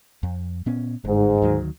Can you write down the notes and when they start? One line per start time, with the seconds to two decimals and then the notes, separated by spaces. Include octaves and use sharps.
0.23 F2
0.66 A#2 B3 C#4
1.05 G1 G#2
1.42 D2 D#3 F#3